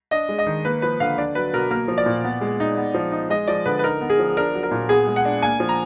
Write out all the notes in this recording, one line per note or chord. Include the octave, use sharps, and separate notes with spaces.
D4 D#5
G#3
D#5
D#3
A#3 B4
F3 B4
D3 F5
D4 D5
F#3 B4
B2 A#4
A#3 A#4
F3
D5
A#2
B3
G#3
D#4
B3
F3
D#4
G#3 D#5
F3 D5
D3 B4
B4
D#4 A#4
B3
G#4
F3
D4 A#4
F#3
A#4
A#2
B3 G#4
G#3
F#5
D4
A#3 G#5
F3
A#5